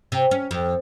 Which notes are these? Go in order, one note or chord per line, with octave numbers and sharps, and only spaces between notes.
C3
C#4
F2